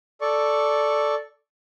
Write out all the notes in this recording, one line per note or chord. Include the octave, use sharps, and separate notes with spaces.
A4 D5 C#6